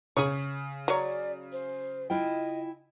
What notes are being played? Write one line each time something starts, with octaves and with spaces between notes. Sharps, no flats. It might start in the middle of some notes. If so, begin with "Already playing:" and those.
C#3 G#4 C#5
F#3 C#5 D5
C5
E4 F4 D#5 G5